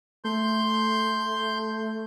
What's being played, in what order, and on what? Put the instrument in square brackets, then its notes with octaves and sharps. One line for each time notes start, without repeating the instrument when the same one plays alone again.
[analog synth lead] A3 [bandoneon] C6 G6